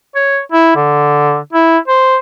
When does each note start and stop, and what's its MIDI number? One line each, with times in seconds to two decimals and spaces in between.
0.16 0.39 73
0.52 0.73 64
0.76 1.37 50
1.53 1.78 64
1.88 2.17 72